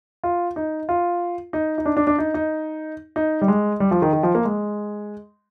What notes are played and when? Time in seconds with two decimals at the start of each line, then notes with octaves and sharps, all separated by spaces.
0.24 F4
0.56 D#4
0.89 F4
1.53 D#4
1.78 D#4
1.86 D4
1.97 D4
2.07 D4
2.18 D#4
2.34 D#4
3.16 D#4
3.41 G3
3.48 G#3
3.80 G3
3.91 F3
4.02 D#3
4.13 D#3
4.23 F3
4.35 A#3
4.45 G#3